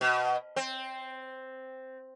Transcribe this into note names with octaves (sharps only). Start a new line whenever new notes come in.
B2
C4